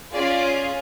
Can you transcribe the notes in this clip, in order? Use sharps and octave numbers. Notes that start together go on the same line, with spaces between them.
C#4 F4 G#4 D5